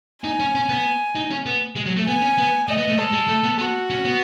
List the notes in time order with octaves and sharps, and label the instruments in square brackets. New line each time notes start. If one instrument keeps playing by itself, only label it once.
[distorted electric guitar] D#4 [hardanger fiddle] G#5
[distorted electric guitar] C#4
C#4
B3
D#4
C#4
B3
G#3
F#3
A3
[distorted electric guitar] B3 [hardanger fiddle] G#5
[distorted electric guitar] C#4
B3
[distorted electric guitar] A3 [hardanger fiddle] D#5
[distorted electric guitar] B3
A3
[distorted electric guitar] G#3 [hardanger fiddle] A4
[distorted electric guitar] G#3
A3
B3
[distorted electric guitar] B3 [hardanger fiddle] F#4
[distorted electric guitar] C#4
B3